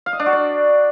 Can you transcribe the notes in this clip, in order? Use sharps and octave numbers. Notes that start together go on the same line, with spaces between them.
F5
D#5
D4
F#4
D5